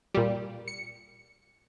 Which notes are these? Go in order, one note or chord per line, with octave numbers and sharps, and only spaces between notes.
A#2 G3
C#7